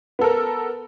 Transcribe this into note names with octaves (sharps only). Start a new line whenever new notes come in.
B3 A4 A#4